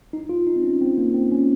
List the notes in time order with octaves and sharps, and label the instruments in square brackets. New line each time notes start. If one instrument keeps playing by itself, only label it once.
[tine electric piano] D#4
F4
D#4
C4
C#4
C4
A#3
C4
C#4